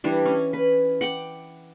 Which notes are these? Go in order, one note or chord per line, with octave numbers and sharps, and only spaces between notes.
E3 G3 D4
C#4
B4
F#5 G5 D6